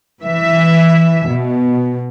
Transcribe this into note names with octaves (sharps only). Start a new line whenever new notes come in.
E3 E5
B2